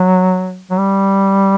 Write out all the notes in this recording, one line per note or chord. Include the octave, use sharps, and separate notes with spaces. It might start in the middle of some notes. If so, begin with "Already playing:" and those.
Already playing: F#3
F#3
G3